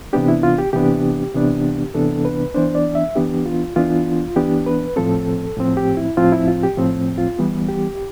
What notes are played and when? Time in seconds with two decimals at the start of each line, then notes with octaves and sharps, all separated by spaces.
0.13 C3 E3 B3 D4 G4
0.28 E4
0.43 F4
0.58 G4
0.73 C3 E3 B3 D4 G4
1.34 C3 E3 B3 D4
1.94 C3 E3 B3 D4 A4
2.25 B4
2.54 E3 B3 D4 C5
2.75 D5
2.95 E5
3.15 E3 B3 D4 G4
3.46 F4
3.76 E3 B3 D4 F4
4.36 E3 B3 D4 G4
4.66 B4
4.96 A2 F3 C4 A4
5.57 A2 F3 C4
5.77 G4
5.97 E4
6.17 A2 F3 C4 F4
6.32 E4
6.48 F4
6.63 G4
6.78 A2 F3 C4
7.18 F4
7.39 E3 G3 B3
7.69 G4